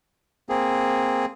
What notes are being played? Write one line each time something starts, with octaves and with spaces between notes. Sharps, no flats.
A#3 C4 G#4